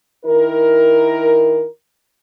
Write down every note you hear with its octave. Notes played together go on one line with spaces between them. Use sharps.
D#3 E4 A#4